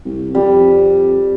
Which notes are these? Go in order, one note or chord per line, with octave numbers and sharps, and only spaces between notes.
C2
F2 G3